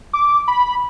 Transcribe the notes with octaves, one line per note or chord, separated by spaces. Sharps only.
D6
B5